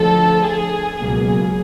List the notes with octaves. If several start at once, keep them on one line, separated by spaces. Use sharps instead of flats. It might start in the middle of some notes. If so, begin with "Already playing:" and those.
Already playing: D2 D3 F3 A4
G#4
C#2 B2 F#3 A#3 G#4